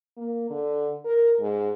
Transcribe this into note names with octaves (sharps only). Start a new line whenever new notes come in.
A#3
D3
A#4
G#2